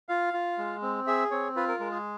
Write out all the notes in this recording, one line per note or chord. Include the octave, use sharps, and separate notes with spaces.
F4 F5
F4
G#3
C4
G#4 E5
C4 C#5
F4 B4
A#4
G#3 A#4
G#4